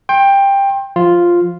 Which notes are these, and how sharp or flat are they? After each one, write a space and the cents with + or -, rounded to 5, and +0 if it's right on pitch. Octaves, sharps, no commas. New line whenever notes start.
G5 +15 C6 +35
F3 +0 F4 +0